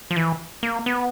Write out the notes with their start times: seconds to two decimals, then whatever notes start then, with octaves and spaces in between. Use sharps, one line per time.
0.11 F3
0.16 E3
0.63 A#3
0.86 B3